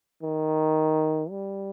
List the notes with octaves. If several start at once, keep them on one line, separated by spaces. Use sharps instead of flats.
D#3
G3